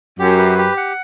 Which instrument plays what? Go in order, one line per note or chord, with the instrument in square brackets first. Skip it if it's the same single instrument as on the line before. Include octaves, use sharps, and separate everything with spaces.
[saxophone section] F#2 [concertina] G4
[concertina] B4
G4
F#5